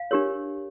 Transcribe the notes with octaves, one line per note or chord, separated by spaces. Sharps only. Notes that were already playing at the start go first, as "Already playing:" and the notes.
Already playing: F5
D4 G4 A#4 C#5